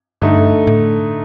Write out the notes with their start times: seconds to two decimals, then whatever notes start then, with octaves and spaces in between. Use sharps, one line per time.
0.22 G2 D3 A3 D#4
0.67 A2